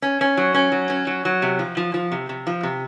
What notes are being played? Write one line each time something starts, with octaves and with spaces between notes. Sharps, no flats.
C#4
C#4
F#3
C#4
F#3
C#4
F#3
F#3
C3
F3
F3
F3
C3
C3
F3
C3